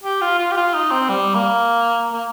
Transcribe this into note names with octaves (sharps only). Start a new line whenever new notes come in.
G4
F4
F4
G4
F4
D#4
C4
G3
A#3
A#3